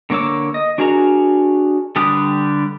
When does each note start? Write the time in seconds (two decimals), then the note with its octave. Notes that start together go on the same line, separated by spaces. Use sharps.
0.10 D3 A#3 C#5 D6 E6
0.54 D#5
0.78 D4 F#4 G#4 A#4 A#5
1.96 D3 G3 G4 B4 D#6